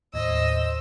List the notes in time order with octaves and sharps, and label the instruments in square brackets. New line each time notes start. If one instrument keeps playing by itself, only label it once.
[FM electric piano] D#2 A2 [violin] C5 E6 [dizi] D#5